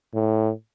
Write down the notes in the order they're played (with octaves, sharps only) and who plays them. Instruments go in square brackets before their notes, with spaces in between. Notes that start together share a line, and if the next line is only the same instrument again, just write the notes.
[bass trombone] A2